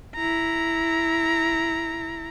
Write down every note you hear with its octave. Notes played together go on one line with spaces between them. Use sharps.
E4 A#5